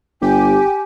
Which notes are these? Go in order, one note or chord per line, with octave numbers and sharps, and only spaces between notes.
G1 G4 G#5